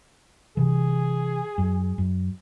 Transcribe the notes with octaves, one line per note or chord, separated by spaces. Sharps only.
C3 E3 G#4
F#2
F#2